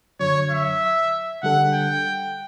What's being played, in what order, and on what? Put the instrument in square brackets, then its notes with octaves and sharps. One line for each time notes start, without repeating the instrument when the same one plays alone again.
[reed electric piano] F#2 D3 F#3 [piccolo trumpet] C#5
[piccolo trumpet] E5
[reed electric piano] D3 G3 D4 A4 [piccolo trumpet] F#5
[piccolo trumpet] G5